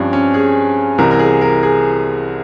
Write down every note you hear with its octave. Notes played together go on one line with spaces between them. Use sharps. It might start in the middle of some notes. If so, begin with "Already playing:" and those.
Already playing: G2 F3 C4 C#4
C#4
G#4
C2 C3 E3 A#4
A#4
G#4
A#4
G#4